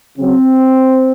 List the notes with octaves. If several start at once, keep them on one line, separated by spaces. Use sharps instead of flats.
C#3 F#3 C4